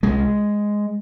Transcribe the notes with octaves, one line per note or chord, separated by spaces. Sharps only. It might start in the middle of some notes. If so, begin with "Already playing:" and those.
C2 G#3